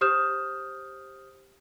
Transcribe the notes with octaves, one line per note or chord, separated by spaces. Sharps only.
G4 C5 D#6 F6 G6 E7